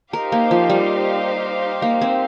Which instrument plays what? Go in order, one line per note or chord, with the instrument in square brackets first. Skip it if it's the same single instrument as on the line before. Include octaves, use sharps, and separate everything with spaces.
[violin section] D#4 G4 C5 F5 [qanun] A#4
[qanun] A#3
F3
G3
A#3
C4